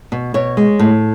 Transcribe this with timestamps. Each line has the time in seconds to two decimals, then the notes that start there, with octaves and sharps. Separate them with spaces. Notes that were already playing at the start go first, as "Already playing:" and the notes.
0.12 B2
0.34 B2 C#5
0.57 G#3
0.79 A2